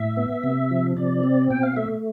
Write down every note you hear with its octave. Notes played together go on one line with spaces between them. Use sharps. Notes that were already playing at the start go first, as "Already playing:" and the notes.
Already playing: A2 E5
B3
C3
F3
C3 D5
C4
B2 G5
F5
A3 E5